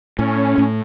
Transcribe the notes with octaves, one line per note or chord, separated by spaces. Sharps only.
A2 C#4
A2